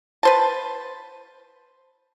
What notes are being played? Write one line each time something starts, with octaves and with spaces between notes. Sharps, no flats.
B4 C5 A5